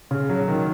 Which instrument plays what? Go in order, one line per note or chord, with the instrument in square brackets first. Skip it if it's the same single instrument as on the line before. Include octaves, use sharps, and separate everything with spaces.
[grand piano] C#3
F#3
D#3